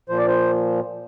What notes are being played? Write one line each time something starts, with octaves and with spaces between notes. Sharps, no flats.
A#2 F3 C5
D5
C5